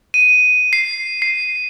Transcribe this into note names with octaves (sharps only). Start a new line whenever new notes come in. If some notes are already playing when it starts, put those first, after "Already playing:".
D#7
C7
C7